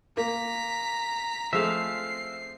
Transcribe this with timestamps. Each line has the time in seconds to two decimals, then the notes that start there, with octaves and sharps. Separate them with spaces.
0.17 A#3 A#5 B6
1.53 F3 G#3 A3 C4 E5 F5 C7